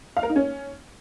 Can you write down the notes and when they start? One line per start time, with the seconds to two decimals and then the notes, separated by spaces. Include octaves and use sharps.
0.17 F5
0.23 A#4
0.29 D#4
0.36 C#4